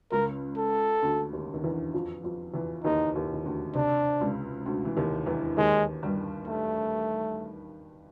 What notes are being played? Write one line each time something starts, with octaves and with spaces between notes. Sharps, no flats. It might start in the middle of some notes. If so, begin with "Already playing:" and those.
C#2 C#3 A#4
A4
D2 D3
D#2 D#3
D#3
E2 E3
F2 F3
F2 F3
E2 E3
D#2 D#3 D#4
D#2 D#3
D#3
D2 D3
C3 D4
C#2 C#3
D2 D3
E3
D#2 D#3
E2 E3
D#2 D#3 G#3
G2 G3
A3